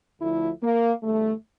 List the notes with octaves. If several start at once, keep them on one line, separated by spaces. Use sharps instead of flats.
D2 D3 F3 A3 E4
A#3
E2 D3 G3 A3